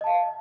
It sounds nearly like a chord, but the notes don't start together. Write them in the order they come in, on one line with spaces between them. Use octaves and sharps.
D#5 A5 F5